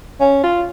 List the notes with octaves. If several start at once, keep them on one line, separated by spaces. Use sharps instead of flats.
C#4
F4